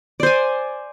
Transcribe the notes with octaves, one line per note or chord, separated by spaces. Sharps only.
C5 D5 G#5